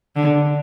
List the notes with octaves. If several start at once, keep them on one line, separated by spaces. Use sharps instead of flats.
D3